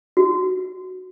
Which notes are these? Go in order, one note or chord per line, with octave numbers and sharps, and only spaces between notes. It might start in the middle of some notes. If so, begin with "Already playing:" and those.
F#4